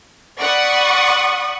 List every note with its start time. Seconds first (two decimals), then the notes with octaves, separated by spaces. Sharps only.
0.39 D5 F#5 B5 C#6 D#6